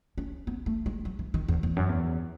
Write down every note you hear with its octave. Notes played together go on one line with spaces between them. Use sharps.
C#4
B3
A3
G#3
F#3
E3
D#3
E2
E2
F#2
E2